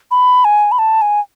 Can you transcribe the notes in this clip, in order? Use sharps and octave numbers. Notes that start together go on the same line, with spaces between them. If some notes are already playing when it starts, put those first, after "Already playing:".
B5
G#5
B5
A5
G#5